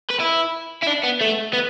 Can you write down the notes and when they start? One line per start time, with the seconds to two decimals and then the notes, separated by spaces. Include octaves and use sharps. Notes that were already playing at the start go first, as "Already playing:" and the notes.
0.10 B4
0.19 E4
0.82 E4
0.87 D4
1.03 B3
1.21 A3
1.53 B3